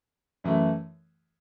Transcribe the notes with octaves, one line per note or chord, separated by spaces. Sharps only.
F#2 E3 A3